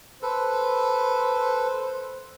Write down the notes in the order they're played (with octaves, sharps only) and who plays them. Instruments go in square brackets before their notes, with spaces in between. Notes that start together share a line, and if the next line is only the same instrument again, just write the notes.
[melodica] A4 B4 [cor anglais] C5